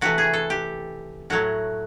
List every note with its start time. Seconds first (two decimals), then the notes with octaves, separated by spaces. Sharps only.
0.01 C3 E3 A3 F#4
0.18 G#4
0.33 A4
0.50 G4
1.30 A2 F#3 A3 F#4